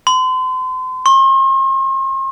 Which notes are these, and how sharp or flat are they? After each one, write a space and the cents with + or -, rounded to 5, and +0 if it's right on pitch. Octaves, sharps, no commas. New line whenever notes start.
C6 -35
C6 +45